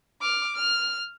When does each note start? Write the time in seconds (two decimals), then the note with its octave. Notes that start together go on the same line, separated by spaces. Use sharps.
0.21 D6 F6
0.55 F6